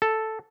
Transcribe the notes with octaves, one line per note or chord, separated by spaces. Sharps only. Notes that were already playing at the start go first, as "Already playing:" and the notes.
A4